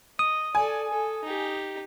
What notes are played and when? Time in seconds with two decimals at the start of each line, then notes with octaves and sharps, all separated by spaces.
0.19 D#5 D#6
0.55 A4 D5 G#5
0.89 A4
1.24 D#4 G4